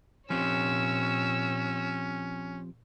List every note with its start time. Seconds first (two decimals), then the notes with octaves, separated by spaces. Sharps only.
0.30 A#2 F3 C4 C#4 G4 C#5 E6